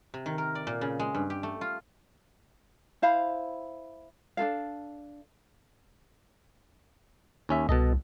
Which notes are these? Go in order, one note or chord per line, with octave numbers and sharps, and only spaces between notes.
C3
D#3
A#4
D5
A#2
C#3
G#3
G2
G4
A3
F4
E4 C5 F5 B5
D4 F4 A4 F5
D#2 C#4 E5
C2 B2 A4 D#5